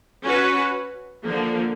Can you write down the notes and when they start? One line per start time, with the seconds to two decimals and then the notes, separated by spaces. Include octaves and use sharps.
0.23 C#4 F#4 B4
1.24 D3 F3 A#3